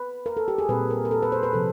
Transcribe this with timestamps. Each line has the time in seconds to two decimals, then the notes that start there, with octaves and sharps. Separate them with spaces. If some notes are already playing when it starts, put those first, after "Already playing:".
Already playing: B4
0.26 A#4
0.37 A4
0.48 G4
0.58 G#4
0.68 A#2 G3 C4 B4
0.90 A#4
1.05 A#4
1.11 A4
1.23 B4
1.32 C5
1.43 B4
1.53 C3 F3 A4